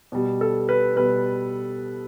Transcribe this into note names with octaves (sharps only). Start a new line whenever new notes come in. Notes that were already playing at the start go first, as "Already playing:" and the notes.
B2 G3
A4
B4
B2 G3 B4